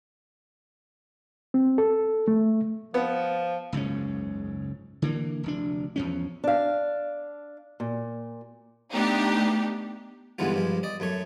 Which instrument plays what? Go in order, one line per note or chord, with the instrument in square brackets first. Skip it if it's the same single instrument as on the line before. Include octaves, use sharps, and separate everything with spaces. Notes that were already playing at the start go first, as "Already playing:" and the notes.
[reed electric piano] C4
A4
A3
[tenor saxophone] F3 [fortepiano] B3
[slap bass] F#1 C#2 G#2 C#4
D3 E3 A#3
F1 D2 D4
E2 F3 C#4
[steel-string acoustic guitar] D4 F5
A#2
[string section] A3 B3 D4 D#4 G4
[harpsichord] G2 D3 E3 G#3 B3 F4
G2 F3 G#3
D5 D#5
F#2 A3 C#5